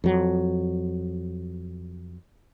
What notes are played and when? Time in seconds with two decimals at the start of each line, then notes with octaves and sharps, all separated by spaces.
0.04 F2 F#3